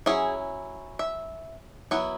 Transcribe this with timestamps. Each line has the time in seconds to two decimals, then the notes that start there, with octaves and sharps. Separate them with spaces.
0.06 F#3 C#4 E4 G#4
0.99 E5
1.91 F#3 B3 E4